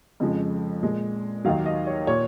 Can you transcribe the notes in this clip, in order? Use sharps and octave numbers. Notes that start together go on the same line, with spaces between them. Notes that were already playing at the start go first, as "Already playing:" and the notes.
F2 C#3 F3 G#3
A#2 G#3
D#2 D#3 F#3 F5
D#5
C#5
A#2 C#5